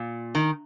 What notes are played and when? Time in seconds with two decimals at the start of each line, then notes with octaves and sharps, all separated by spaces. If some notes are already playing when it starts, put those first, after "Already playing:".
Already playing: A#2
0.35 D#3